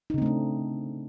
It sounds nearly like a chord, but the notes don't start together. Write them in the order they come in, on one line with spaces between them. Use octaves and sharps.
D#4 C#3 C4 A3 D4